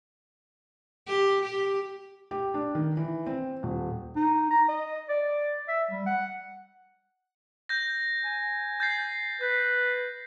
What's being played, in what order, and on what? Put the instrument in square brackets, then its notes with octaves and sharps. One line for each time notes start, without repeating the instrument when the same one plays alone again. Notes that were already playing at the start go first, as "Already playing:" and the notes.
[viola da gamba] G4
G4
[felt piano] G4
D4
D#3
E3
C4
D#1
[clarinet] D#4
A#5
D#5
D5
E5
G3
F#5
[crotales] G6 A#6
[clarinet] G#5
[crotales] G6 A6 C7
[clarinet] B4 [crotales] G6